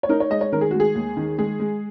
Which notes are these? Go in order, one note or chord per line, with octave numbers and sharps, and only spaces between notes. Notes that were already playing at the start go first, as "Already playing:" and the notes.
C#5
D#4 A#4
C#5
G#3 D#5
C#5
D#3 A#4
G#4
G#3 F#4
G#4
D#2
D#3
G#3 G#4
G#3